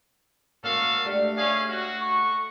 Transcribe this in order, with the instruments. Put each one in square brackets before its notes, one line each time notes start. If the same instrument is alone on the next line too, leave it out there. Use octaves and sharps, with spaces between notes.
[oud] G#2 A#3 C#4 [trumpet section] F#4 A4 F5
[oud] A3 D4 G4
[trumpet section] C#4 G#4 F5
F#4
[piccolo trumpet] C#6